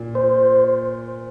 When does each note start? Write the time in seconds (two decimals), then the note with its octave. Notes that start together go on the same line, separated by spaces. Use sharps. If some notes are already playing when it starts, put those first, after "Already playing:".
Already playing: A#2
0.15 C5